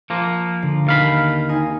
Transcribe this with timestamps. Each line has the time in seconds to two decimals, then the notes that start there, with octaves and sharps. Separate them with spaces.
0.10 F3 A#3
0.63 D3
0.87 D#2 F5 B5
1.49 C4 D#4 G#5